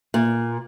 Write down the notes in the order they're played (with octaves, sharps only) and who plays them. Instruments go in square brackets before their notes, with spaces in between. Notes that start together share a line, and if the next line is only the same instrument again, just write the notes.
[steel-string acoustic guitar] A#2